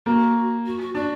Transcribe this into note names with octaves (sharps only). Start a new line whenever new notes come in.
A#3 F#4
F#4
F#4
D4 F#4